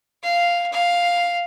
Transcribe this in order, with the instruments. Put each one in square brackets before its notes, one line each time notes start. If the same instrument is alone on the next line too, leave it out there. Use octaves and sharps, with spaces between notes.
[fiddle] F5
F5